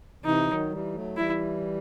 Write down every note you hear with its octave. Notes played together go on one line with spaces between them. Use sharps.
C3 E3 D#4
D#3 F#3
E3 G3
F#3 A3
E3 G3 E4